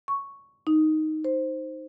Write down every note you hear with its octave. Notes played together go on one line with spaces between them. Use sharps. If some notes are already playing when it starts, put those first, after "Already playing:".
C#6
D#4
C5